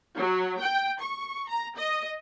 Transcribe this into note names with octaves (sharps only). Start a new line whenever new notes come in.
F#3
G5
C#6
A#5
D#5